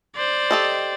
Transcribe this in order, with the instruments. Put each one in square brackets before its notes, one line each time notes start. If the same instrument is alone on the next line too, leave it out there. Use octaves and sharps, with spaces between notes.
[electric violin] C5 D5
[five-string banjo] G4 A4 D#5